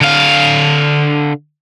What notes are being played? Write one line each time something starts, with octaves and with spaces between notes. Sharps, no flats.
D3 F5